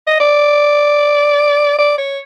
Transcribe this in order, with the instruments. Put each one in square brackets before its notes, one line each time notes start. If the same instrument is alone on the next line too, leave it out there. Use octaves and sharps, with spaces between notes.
[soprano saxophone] D#5
D5
D5
C#5